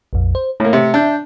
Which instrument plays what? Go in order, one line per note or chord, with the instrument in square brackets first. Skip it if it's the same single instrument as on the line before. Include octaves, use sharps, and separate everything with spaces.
[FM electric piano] A#1 F2
C5
[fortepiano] A2 A#3 [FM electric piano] A3
[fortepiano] C3
[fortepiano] D4 [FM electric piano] E5 G6